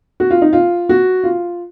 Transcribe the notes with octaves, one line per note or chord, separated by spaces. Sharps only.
F#4
F4
D#4
F4
F#4
F4